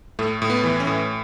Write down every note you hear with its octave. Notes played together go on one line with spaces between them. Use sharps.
A2 A3
A2
B3
E3
C#4
A2